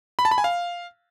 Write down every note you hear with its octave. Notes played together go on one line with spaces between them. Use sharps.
B5
A5
B5
G#5
F5